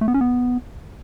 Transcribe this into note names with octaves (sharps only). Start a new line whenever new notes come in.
A3
B3
C#4
B3